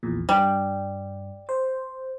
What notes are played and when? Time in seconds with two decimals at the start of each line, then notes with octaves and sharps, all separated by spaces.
0.03 A#1 E2 A#2
0.29 G2 G3
1.49 C5